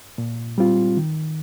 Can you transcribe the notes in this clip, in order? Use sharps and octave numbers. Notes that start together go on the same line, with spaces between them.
A#2
G3 C4 F4
D#3